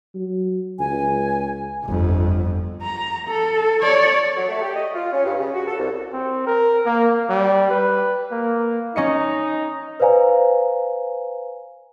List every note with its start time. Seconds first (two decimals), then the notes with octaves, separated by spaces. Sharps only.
0.15 F#3
0.79 C#2 G#5
1.84 G1 F2
2.82 A#5
3.28 A4
3.82 C#5 D5
4.37 F#3
4.49 A3
4.62 G4
4.75 D#5
4.94 F4
5.12 C#4
5.25 G2
5.39 C#3
5.54 F#4
5.67 A4
5.78 C2
6.12 C4
6.47 A#4
6.85 A#3
7.29 G3
7.70 B4
8.31 A#3
8.96 C#4 D#4 D#5 C#7
10.00 B4 C5 D5 F5 G#5 A#5